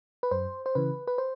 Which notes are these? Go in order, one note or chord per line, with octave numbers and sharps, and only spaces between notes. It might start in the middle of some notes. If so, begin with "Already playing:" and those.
B4
F#2 C5
C5
C#3 E3 B4
B4
C5